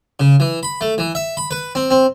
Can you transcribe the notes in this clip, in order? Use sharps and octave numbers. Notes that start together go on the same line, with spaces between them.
C#3
E3
B5
A3
E3
E5
B5
B4
C4
C4